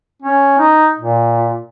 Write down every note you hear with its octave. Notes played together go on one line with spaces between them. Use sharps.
C#4
D#4
A#2